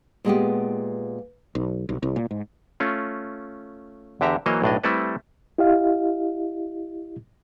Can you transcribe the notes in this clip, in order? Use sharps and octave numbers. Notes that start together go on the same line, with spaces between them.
A#2 G#3 B3 G4
B1
B1
C2
A#2
G#2
A3 C#4 F4
E2 D3 G4 E5 A#5
E3 F#3 A#3 C5 C#5 D#5
B1 A2 D4 D#5
G3 A3 C4 E4 A4 B4
E4 G4 D#5 F5